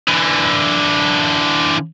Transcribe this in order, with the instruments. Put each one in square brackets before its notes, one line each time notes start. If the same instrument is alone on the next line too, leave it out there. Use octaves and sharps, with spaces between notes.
[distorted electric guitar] D3 E3